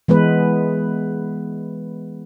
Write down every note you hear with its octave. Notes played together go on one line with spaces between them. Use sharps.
E3 G#3 B3 B4